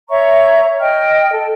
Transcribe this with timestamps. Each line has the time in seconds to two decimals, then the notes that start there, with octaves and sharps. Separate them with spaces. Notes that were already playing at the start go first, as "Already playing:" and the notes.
0.09 C#5 E5 A#5 C#6
0.79 D#5 G5 F6
1.31 A4